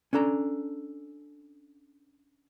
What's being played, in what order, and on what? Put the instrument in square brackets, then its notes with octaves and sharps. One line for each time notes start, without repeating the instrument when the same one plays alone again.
[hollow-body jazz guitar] C#4 D4 A4 A#5